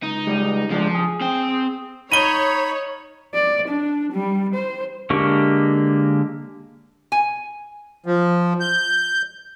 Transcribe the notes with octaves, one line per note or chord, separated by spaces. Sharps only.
C#2 D#4
C#2 G3 G#3
C#3 F3 G#3 D4
G#4
C4 G5
D#4 C#5 B5 D#7 G7
D5
D4
G3
C5
D3 G#3 A#3 G4 C#6
G#5
F3
G6